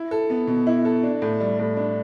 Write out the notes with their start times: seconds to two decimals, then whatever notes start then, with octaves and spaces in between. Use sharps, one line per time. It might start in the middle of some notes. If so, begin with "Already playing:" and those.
Already playing: E4
0.11 A4
0.30 B3
0.47 B2
0.67 E4
0.85 A4
1.03 D4
1.22 A2
1.40 G3
1.59 A2
1.77 D4